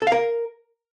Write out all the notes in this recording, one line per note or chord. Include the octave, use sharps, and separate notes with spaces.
A4
F5
A#4